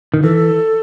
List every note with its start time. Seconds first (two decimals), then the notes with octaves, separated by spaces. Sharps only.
0.14 D#3
0.23 E3 A4